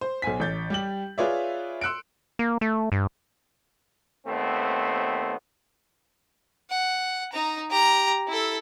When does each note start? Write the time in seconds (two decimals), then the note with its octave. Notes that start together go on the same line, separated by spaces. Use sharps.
0.01 C5
0.22 B1 C5 G#5 B6
0.40 A1 G6 A6
0.70 G3 G4 F#7
1.18 F4 G#4 B4 C#5 D5 E5
1.81 C6 E6 F#6 C#7 D7
2.39 A#3
2.61 A3
2.92 G2
4.27 D#2 A3 B3 C4 C5
6.70 F#5
7.32 D#4 A#5
7.70 G4 A#5
8.28 E4 A4